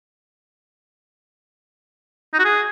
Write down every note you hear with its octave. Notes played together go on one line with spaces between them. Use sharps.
D#4
F#4
G#4